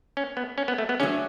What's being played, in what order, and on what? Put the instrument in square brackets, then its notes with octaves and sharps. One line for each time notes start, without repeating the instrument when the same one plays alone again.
[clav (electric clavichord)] C#4
B3
C#4
B3
A3
B3
[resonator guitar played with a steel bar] F#3 A3 D4 G#4 [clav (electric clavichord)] C#4